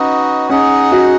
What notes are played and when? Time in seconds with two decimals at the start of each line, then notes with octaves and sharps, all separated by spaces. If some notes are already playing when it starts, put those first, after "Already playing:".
Already playing: C#4 D#4 F#4 B4 D#5
0.50 C#4 D#4 G#4 D#5 F#5
0.92 F#4